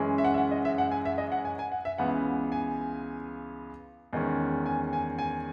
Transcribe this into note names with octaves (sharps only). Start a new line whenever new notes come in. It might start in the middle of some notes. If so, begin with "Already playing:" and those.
Already playing: F#2 E3 G#3 C#4
E5
F#5
E5
F#5
D#5
E5
F#5
G#5
E5
D#5
F#5
G#5
G#5
F#5
E5
C#2 C#3 E3 B3 F#5
G#5
E2 D#3 G#3 C#4
G#5
G#5
G#5